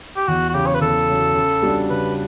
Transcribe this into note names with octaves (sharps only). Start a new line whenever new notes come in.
G4
E2 F#4
F#4
C#3 F#3 G4
C#5
B4
E2 A4
C#3 F#3
C#3
G3 D4 F#4
C#3 B4